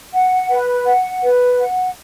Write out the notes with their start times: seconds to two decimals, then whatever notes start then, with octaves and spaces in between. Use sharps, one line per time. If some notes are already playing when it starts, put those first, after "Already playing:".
0.14 F#5
0.50 B4
0.85 F#5
1.22 B4
1.58 F#5